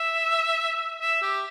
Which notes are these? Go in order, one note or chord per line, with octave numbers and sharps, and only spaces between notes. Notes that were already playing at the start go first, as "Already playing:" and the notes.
Already playing: E5
E5
G4